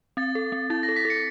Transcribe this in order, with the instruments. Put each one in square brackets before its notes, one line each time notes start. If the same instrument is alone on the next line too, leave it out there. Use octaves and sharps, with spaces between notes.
[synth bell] C4 [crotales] A6
[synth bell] A4
C4
[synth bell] E4 [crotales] A6
[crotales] A#6
[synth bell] A4
[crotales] B6
[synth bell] A4
[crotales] C#7